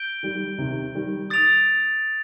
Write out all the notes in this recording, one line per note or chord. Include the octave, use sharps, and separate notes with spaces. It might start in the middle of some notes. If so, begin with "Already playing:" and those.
Already playing: G6 D7 G7
D#3 G3
C3 D#3
D#3 G3
D#6 A6 D7 F7